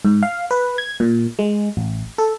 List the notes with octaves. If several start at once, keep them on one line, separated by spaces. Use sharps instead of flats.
G#2
F5
B4
G#6
A#2
G#3
A1
A4